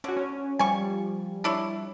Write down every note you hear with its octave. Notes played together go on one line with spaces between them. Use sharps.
D3 C#4 F#4
C#4
F3 G3 G#5 C#6
D4 E4 C#5